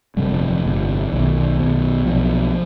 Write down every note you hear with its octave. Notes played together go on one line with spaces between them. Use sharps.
G1 F2 C3 G3
F3
F3
G1 F2 C3
B1 B2 D#3
B1 B2
B1 B2 F3